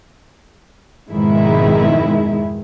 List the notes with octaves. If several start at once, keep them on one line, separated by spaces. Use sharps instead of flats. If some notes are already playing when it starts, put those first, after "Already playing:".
F2 G#2 B2 D#3 G#3 E4